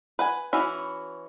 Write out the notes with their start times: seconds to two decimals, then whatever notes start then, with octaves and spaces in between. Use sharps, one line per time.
0.19 B4 F#5 G#5
0.53 E3 C#4 E4 F#4